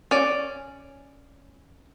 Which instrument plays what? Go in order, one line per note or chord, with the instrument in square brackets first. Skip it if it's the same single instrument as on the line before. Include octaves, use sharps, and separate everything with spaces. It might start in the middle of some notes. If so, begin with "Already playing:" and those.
[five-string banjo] C#4 D5